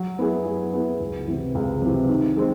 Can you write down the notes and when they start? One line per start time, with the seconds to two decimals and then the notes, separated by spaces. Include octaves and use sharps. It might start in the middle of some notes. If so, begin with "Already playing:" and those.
Already playing: F#3
0.19 B3 E4 G#4
0.46 F#3
0.73 B3 E4 G#4
1.00 C#2
1.27 C3 E3
1.55 C#2
1.82 C3 E3
2.09 D#3
2.37 G#3 C4